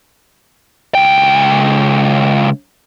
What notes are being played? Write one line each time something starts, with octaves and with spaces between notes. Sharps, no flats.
C#2 G5